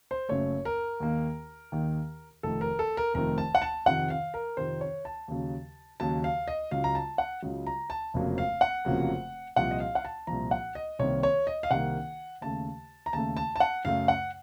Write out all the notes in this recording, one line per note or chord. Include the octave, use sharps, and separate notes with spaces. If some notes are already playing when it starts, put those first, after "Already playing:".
C5
F#1 F#2 C#3 A3 C#5
A#4
D#2 D#3 A#3
D#2 D#3 A#3
F1 F2 D#3 A3 A4
A#4
A4
A#4
F1 F2 D#3 A3 A#4
A5
F#5
A5
F2 C3 D#3 F#5
F5
A#4
F2 C3 D#3 C5
C#5
A5
D#2 C#3 F#3
D#2 C#3 F#3 A5
F5
D#5
C#2 C#3 F#3 F5
A#5
A5
F#5
C#2 C#3 F#3
A#5
A5
F1 F2 C#3 F#3 A#3
F5
F#5
F1 F2 C#3 F#3 A#3
C2 A#2 F3 F#5
D#5
F5
F#5
A5
C2 A#2 F3 A#5
F#5
D#5
C2 C3 D#3 A#3 C#5
C#5
D#5
F5
C2 C3 D#3 A#3 F#5
D#2 C#3 A3 A5
A#5
D#2 C#3 A3 A5
A5
A5
F#5
F#2 C#3 F#3 A3 F5
F#5